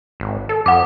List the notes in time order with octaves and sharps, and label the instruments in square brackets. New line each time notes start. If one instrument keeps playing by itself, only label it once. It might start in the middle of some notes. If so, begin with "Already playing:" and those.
[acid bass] G#1
A4
[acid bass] F2 [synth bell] F#5 D6